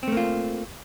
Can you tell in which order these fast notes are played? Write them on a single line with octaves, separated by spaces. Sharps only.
C4 A3 A#3 F4